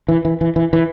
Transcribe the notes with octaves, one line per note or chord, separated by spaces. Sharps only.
E3
E3
E3
E3
E3